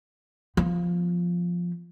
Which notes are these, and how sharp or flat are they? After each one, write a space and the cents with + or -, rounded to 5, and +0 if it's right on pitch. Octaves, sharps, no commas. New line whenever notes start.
F3 +0 B3 +0